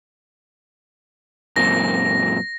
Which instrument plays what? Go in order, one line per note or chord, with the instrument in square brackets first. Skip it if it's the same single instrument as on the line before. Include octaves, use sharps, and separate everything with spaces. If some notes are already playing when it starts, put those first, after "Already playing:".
[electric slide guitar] F#2 A#2 C4 [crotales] A#6